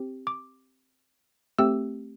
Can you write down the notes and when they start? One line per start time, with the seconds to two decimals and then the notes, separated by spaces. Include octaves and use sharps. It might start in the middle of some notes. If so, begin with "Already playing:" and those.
Already playing: C4 G4
0.27 D6
1.58 A3 C4 G4 E6